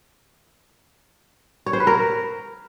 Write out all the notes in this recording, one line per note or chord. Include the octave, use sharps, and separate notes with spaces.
C#5
C5
B4
A#4